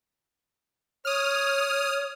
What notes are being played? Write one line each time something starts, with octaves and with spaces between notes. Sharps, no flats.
C#5 D#6 F6